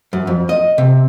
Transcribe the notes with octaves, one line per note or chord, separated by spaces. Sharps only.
F#2
F2
D#5
C3